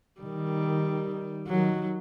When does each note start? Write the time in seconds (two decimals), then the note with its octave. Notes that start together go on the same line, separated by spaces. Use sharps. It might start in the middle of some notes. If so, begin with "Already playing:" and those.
0.21 D#3 G3
1.47 D#3 F#3